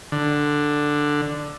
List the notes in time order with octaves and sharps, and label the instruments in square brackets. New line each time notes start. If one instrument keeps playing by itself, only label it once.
[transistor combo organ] D3